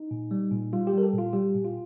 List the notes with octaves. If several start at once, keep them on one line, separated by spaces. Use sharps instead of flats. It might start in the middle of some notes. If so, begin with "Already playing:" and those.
Already playing: D#4
A#2
G3
A#2
G3 F4
G4
G3 A#4
A4
A#2
F4
G3 G4
A#2
F4